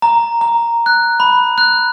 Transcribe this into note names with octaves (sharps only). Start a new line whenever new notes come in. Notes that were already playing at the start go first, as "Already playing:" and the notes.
A#5
A#5
F#6
B5
F#6